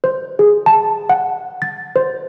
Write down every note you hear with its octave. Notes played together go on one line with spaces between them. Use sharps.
C5
G#4
A5
F#5
A6
C5